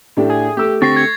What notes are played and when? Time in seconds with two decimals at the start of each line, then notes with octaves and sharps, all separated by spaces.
0.17 A2 D4 G4
0.30 G#4
0.57 A3 G4 E6
0.82 D3 C4 G4 C#6 A6 A#6 C7
0.96 G#6